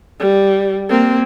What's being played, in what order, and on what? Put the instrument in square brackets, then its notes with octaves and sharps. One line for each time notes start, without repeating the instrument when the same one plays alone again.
[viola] G3
A#3 C4